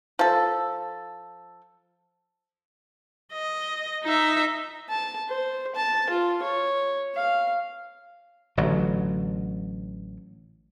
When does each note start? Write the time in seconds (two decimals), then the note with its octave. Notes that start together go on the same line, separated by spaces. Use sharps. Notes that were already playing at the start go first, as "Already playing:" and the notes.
0.19 F3 A4
3.33 D#5
4.04 D#4 E5
4.89 A5
5.29 C5
5.75 A5
6.10 F4
6.43 C#5
7.15 F5
8.57 A1 D3 F#3